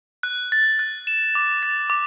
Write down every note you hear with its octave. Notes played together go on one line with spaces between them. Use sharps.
F#6
A6
F#6
E7
D6
A6
D6